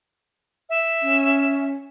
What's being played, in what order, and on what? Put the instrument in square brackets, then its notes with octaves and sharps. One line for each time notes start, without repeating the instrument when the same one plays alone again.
[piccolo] E5
[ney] C#4